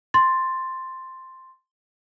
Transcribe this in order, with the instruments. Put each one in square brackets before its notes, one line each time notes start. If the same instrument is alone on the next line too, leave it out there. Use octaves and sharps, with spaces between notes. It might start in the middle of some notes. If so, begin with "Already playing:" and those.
[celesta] C6 A6